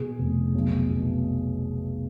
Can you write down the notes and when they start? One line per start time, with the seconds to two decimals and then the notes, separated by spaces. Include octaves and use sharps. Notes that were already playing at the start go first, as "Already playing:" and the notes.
Already playing: B2 G#4
0.19 F1
0.55 B1
0.90 B2